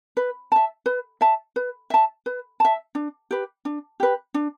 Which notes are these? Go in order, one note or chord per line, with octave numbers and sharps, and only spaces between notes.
B4
E5 A5
B4
E5 A5
B4
E5 A5
B4
E5 A5
D4
G4 B4
D4
G4 B4
D4